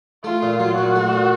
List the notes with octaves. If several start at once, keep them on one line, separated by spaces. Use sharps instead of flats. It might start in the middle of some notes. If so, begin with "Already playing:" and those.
A3 F4
A#2
F#3
A#2 F#4
A3
A#2